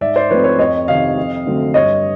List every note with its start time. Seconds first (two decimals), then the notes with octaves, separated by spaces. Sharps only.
0.01 G#2 D5 E5
0.16 C5 D5
0.30 F3 A3 C4 B4 C#5
0.44 B4 C#5
0.59 F2 C#5 D#5
0.88 C3 D#3 D#5 F5
1.17 F2
1.46 D3 F#3 A3 C4
1.74 G2 C#5 D#5